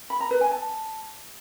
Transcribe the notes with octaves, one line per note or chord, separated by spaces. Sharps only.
B5
A#5
B4
G#5
A5